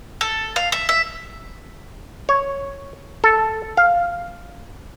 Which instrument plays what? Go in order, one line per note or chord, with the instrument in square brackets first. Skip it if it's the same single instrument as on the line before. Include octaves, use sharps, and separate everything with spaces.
[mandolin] A4
F5
E5
E5
[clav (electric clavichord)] C#5
A4
F5